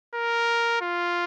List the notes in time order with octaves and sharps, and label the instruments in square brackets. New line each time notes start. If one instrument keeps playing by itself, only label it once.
[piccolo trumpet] A#4
F4